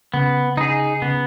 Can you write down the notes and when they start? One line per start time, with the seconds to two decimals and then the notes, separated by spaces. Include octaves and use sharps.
0.14 C#3 B3
0.57 C#3 D#4 G#4
1.02 C#3 B3